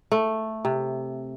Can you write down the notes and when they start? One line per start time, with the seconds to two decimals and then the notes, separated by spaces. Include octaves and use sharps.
0.12 A3
0.65 C3